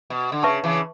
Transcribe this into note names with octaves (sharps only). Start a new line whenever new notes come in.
B2
D3
C#3 B4 E5 A5 C#6
C#3 E3